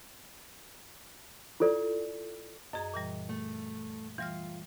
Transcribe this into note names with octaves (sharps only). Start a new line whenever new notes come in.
E4 F4 A4 D5
F#2 G#4 D#5 A#5
A#2 E3 G3
A3
E3 G3 F4 F6